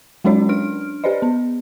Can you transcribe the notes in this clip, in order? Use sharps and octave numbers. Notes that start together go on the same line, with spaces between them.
F#3 G#3 C#4 F#4 C#5 D5
D4 F6 D7
G4 B4 C5 D5 D#5
B3